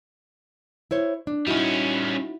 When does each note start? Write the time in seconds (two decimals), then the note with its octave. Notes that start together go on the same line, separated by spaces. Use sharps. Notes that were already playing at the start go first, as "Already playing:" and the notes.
0.91 E4 C5 C#5
1.27 D4
1.47 G3 C#4 D#4 E4 F#4